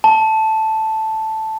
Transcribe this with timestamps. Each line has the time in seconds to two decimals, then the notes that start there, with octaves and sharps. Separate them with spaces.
0.04 A5